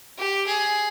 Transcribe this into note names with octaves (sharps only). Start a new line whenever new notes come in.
G4
G#4